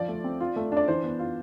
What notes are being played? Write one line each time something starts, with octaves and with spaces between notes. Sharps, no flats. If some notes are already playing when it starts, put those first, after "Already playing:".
Already playing: F3 F4 D5
A3
C4
F4
A3
D4 D5
E3 C5
B3
F4